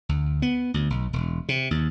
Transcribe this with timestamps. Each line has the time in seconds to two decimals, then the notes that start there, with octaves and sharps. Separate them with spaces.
0.09 D2
0.42 B3
0.74 D2
0.90 B1
1.13 E1
1.49 C3
1.71 D#2